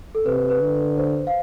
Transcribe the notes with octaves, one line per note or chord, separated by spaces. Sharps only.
A4
C3 B4
B4
B4
D3
C5
F5